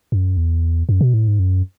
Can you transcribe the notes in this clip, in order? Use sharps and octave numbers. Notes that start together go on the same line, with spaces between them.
F#2
E2
F#2
B2
A2
G#2
F#2